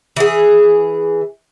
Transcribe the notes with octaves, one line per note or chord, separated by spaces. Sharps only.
E3 G#4